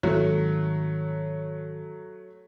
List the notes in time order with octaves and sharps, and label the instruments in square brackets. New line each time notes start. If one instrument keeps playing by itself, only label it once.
[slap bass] G#1 [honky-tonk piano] F#3 A3